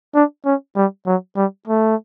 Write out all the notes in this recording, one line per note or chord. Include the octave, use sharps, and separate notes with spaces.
D4
C#4
G3
F#3
G3
A3